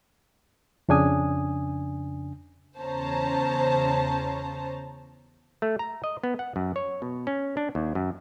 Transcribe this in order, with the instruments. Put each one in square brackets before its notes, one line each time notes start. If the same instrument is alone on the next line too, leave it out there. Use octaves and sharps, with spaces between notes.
[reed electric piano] F2 C#3 D4 G#5 D#6
[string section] E2 C#3 C#4 C5 A5 A#5
[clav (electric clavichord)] A3
A#5
D#5
B3
F#5
F#2
C#5
B2
C#4
D4
D#2
F#2